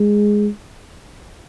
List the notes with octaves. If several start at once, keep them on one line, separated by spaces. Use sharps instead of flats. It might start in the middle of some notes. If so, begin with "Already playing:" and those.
Already playing: G#3